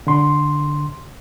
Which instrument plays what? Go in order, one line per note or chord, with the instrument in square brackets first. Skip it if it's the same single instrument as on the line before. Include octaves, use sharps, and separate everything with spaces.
[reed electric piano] D3 C6